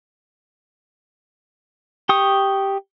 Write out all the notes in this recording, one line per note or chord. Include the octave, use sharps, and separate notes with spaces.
G4 C#6 D#6